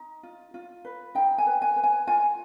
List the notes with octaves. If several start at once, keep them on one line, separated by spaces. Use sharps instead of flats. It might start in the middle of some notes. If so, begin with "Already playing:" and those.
Already playing: D#4
F4
F4
B4
D#4 G5
G#5
B4
G#5
B4
G#5
F4 G#5